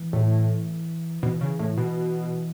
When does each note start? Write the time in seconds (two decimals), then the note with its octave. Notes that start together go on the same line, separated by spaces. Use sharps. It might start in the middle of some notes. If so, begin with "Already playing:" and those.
Already playing: E3
0.13 A2
1.23 B2 E3
1.41 C#3
1.59 A2
1.78 B2